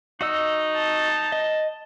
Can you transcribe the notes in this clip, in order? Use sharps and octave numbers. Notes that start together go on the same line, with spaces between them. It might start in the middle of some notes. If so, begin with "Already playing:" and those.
D#4 F#4 D#5 E6
A5
D#5